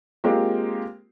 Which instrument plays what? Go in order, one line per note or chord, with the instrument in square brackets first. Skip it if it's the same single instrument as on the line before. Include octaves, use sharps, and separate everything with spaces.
[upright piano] G#3 A#3 C4 F4 G4